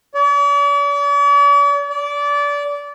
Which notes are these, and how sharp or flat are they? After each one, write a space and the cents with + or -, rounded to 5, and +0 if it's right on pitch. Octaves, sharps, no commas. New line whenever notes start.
D5 -45
D5 -25